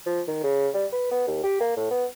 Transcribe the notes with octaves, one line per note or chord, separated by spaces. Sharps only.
F3
D#3
C#3
G3
B4
B3
D#2
G4
A#3
A2
B3